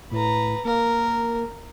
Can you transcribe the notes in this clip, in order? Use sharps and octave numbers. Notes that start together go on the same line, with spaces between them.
A2 B4 A#5
A#3 A#4